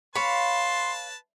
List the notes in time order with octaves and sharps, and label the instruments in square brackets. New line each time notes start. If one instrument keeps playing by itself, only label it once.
[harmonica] B4 A5 [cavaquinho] C#5 B5 [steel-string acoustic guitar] F5 [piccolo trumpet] C6